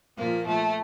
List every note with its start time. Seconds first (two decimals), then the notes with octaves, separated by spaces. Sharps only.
0.16 A#2 F3 A#3
0.47 A3